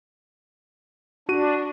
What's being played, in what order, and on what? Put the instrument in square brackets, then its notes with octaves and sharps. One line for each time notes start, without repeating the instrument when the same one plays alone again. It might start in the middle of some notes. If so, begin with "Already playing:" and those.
[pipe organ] D4 [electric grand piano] F#4 D#7